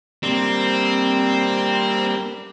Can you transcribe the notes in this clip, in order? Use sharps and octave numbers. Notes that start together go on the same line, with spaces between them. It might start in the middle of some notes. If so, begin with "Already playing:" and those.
G3 A#3 C4 D4